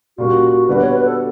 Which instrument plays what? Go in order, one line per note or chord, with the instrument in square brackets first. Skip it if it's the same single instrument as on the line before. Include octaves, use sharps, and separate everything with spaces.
[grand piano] A#2 G3 A#3 C#4 [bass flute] F#4
[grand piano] D3 G3 B3 D4 F#4 [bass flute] B4
[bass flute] C#5
B4
A4